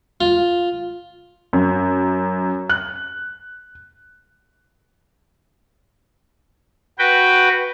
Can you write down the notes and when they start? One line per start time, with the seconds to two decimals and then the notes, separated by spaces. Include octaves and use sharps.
0.21 F4
1.53 F#2
2.69 F#6
6.99 F#4 B4 G5